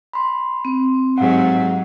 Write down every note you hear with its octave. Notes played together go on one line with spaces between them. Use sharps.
B5 C6
C4
G#2 F#3 G4 F5 F#5